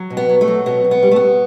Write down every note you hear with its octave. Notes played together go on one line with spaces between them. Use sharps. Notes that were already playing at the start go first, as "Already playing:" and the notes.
Already playing: F#3
B2
B3
F#3
A3
F#3
B2 B3
B2
B3
G3
A3
B3
G3